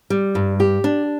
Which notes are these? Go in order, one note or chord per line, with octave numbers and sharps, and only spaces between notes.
G3
G2
G4
D4